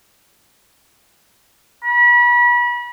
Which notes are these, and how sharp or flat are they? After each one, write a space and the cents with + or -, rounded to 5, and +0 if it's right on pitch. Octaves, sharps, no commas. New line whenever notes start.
B5 -35